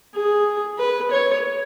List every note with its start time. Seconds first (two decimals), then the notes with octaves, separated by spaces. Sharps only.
0.14 G#4
0.78 B4
1.10 C#5